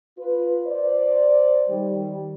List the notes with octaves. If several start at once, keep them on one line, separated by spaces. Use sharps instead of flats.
F4 B4
C5 D5
D#3 G3